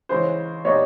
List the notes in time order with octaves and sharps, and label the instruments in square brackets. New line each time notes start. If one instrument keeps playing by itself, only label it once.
[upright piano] C#3 E3 G#3 C#4 E4 [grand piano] C5
[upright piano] A#2 G3 B3 D#4 [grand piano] C#5